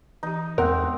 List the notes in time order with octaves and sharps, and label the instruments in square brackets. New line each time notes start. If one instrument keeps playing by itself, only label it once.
[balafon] E3 G4 [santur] D#4
[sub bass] E2 [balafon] G#3 B3 [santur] C4 F#5 [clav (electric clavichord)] A#4